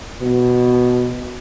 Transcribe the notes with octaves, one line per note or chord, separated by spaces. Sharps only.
B2